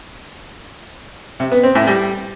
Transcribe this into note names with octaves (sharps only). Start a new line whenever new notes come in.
C3
B3
C4
A2
G3